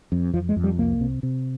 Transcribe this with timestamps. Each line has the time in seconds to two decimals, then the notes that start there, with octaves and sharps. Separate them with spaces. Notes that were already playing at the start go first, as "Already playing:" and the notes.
0.12 F2
0.33 F2 F3
0.49 G#3
0.56 F2
0.64 G3
0.78 C2 A#3
1.01 C3
1.23 C3